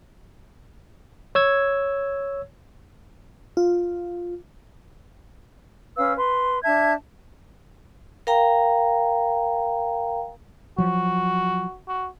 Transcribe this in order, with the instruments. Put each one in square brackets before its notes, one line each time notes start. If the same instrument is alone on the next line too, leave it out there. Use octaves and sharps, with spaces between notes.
[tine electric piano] C#5 E6 G#6
[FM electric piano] F4
[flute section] C#4 B4 F5 E6
B4 C6
D4 E5 A5 G#6
[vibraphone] A#4 F5 G5 A#5
[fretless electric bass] F3 F#3 [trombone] F#4
[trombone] F#4